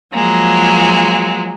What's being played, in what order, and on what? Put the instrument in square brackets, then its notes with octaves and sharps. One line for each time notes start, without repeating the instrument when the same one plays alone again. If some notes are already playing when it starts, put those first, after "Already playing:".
[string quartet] F3 F#3 G#3 A#3